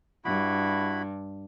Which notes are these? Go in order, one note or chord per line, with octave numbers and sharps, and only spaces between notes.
G2 E4 F#4 B5